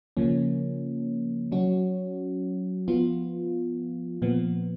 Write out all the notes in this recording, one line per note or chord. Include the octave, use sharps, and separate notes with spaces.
C#3 F3 A#3 C#4
F#3 C#4 F#4
F3 B3 F4
A#2 F3 B3